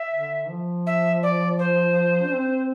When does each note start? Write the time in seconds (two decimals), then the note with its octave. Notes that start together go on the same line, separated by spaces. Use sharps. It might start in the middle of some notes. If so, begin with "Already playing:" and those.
Already playing: E5
0.13 D3
0.49 F3
0.87 E5
1.23 D5
1.59 C5
2.23 D4
2.33 C4